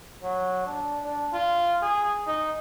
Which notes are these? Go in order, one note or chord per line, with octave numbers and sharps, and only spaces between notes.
F#3
D4
D4
F4
G#4
D#4